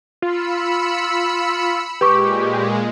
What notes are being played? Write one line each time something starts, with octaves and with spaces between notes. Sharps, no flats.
F4 B5 E6 C#7
A#2 G#3 G4 B4 C#6 D6